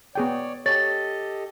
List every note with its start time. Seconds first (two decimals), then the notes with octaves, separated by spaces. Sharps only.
0.15 B3 G#4 C#5 D5 G5
0.66 G4 A4 C#5 D#5 A6